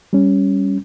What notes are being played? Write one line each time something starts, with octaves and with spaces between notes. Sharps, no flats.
G3 C#4